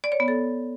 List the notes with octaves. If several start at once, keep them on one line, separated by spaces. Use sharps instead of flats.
D5
C#5
B3
A4